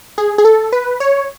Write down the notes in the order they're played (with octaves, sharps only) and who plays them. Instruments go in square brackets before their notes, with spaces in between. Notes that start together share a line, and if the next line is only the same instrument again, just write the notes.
[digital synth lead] G#4
G#4
A4
B4
C#5